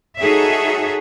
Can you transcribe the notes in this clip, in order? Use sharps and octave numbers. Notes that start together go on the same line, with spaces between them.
D#4 F#4 G#4 A4 C#5 E5